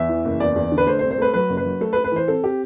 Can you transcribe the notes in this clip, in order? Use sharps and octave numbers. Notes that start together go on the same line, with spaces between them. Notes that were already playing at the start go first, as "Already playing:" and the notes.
Already playing: E2 E5
E3
F#1
E2 D5
E2
D3
B4
A3 C5
C5
C2
C5
A3 B4
F#3 B4
F#1
B4
F#3
A3 A4
B4
A3
B4
E3 C5
C4 A4
C4 G4